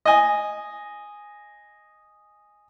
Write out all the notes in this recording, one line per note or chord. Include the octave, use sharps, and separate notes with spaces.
D#5 G#5